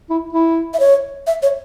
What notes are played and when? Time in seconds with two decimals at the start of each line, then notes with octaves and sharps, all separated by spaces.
0.10 E4
0.33 E4
0.74 E5
0.80 C#5
1.27 E5
1.43 C#5